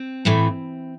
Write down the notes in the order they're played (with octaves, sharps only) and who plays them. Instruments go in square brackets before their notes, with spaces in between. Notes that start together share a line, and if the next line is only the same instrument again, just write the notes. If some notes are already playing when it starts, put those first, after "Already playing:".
Already playing: [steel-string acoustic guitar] C4
A2 E3 A3